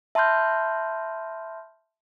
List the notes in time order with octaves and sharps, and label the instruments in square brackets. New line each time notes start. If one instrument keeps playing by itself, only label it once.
[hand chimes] E5 A5 B5 C6 F6 G6